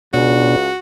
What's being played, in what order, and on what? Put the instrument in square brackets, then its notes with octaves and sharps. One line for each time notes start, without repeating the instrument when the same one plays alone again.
[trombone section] C#2 [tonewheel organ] B2 D4 [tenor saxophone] F#4